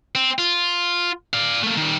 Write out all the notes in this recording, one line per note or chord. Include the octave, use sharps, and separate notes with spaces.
C4
F4
D5 F5
A3 A#3
D#3 G3